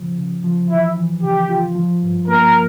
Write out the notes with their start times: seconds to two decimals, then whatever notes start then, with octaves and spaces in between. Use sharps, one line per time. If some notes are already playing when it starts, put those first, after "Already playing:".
Already playing: C#3 F3
0.17 C#3
0.44 F3
0.69 E3 E4
0.96 E3
1.22 C#3 G4
1.49 F4
1.75 F3
2.02 G2
2.28 A#3 A#4